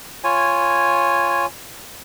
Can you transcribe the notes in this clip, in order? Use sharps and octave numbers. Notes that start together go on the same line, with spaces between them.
F4 C#5 G#5